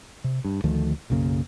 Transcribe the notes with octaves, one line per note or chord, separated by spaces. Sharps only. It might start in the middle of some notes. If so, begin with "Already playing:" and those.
C3
G2
D2 D#3 F3 A3
B1 F#2 C#3 A#3